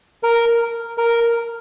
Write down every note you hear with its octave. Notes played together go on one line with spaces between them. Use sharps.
A#4
A#4